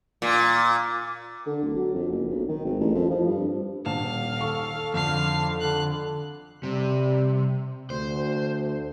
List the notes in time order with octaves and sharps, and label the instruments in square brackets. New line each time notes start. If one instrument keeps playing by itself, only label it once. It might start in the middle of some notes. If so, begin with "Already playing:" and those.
[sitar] A#2
[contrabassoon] D3
D1
F#3
F2
F#1
B1
D#3
G#1
A1
F2
F3
G2
[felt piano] D#1 A5 E7 [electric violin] F5
[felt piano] D#3 C#6 [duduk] A4
[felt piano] F2 [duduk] D3 [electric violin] F5 C7
[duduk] D3 [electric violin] F#6
[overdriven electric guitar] C3 [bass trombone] G3
[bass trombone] D2 [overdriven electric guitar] C5